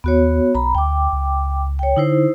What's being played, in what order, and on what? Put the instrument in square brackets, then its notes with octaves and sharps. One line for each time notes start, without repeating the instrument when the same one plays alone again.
[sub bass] D#2 [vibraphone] B3 F#4 C#5
[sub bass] B1 [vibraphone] A#5 B5
[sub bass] D2 [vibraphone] G5 D6
[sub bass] C#2
[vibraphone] C#5 G5
[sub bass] D3 [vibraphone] D#4 E4 C5